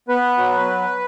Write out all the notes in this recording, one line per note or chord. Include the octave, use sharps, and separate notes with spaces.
B3 B4
F#3